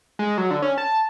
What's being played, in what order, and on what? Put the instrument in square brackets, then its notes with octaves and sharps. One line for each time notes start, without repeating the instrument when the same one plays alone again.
[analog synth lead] G#3
F#3
D3
C#4
A5